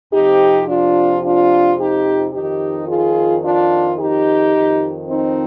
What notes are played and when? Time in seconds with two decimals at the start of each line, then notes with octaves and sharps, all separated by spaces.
0.13 F2 C3 F3 D#4 G4
0.68 D4 F4
1.24 D4 F4
1.79 D#4 G4
2.33 F2 D#3 D#4 G4
2.88 F4 G#4
3.44 D4 F4
3.98 D#4 G4
4.54 F2 D#3
5.08 C4 D#4